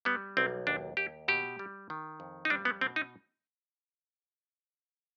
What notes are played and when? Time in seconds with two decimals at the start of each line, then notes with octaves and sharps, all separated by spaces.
0.05 G3 B3
0.37 B1 C4
0.67 D#2 D4
0.97 D#2 G4
1.28 B2 G4
1.59 G3
1.90 D#3
2.20 F2
2.45 D#4
2.50 G3 D4
2.65 B3
2.81 B2 C4
2.96 D#4